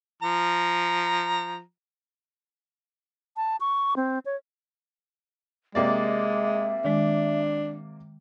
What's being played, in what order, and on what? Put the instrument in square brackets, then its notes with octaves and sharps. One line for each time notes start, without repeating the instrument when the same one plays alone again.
[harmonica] F3 A#5
[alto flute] A5
C#6
C4
C#5
[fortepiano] C3 A#3 D5 [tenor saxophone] G#3 [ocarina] E5
[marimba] D#3 G#3 [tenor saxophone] D4